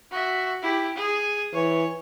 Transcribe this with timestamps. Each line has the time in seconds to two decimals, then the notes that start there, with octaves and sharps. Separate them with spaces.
0.11 F#4 E5
0.62 E4 G4
0.96 G#4
1.53 E3 C#5